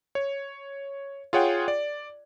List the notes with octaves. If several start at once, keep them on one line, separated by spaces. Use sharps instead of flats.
C#5
F4 G#4 C#5 F#5 G5
D5